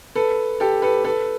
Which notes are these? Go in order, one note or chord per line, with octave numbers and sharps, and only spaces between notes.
A4 B4
G4 A4
A4 B4
A4 B4